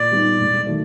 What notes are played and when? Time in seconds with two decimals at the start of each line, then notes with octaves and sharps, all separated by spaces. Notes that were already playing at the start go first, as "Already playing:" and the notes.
Already playing: A#2 D5
0.11 G3 B3 D#4
0.39 E1
0.66 D#3 F#3 A3